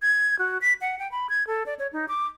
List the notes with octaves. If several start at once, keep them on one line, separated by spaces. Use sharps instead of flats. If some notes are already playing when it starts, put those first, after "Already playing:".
G#6
F#4
B6
F#5
G5
B5
G#6
A4
D5
C#5
D#4
D6